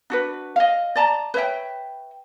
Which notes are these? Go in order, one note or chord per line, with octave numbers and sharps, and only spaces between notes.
D4 F#4 B4
D#5 F5
D5 A5 A#5
B4 C#5 E5 G5